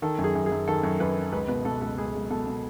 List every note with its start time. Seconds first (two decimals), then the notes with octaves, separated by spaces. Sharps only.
0.02 D#3 A4
0.18 F#2
0.24 G#4
0.35 F#2
0.46 G#4
0.51 F#2
0.67 D#3 A4
0.83 F#2
1.00 F#2 B4
1.17 D#3
1.32 C#2 B4
1.48 B2 B4
1.65 B2 A4
1.81 C#2 A4
1.98 C#2 G#4
2.15 C#2
2.30 B2 A4
2.47 B2